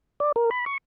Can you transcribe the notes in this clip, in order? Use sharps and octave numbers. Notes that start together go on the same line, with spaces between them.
D5
A#4
B5
C#6